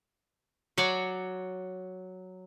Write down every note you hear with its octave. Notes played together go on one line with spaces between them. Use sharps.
F#3 F#4 C#5 D5